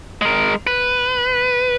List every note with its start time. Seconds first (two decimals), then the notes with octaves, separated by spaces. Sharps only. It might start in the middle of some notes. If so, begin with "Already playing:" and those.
0.22 G#3 A#4
0.67 B4